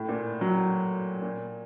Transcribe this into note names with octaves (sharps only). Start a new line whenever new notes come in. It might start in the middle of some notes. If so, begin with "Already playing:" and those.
Already playing: A2
A#2
F#3
A#2